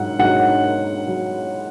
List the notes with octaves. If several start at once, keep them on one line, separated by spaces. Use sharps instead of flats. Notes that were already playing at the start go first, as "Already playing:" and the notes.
Already playing: G#2 F#3 F#5
G#2 F#3 F#5
F#3